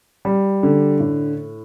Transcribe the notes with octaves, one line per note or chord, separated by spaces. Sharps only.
G3
D3
A2